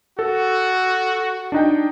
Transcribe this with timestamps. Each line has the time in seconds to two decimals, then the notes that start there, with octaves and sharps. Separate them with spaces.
0.19 F#4 A4
1.52 D4 D#4 G5